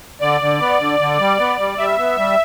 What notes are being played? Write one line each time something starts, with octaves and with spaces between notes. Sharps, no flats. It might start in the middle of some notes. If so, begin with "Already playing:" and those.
D3 D5
D3
B3
D3
D3
G3
B3
G3
G3 E5
B3
G3